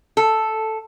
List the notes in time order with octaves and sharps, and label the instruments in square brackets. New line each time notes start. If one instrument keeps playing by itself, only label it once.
[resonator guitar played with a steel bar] A4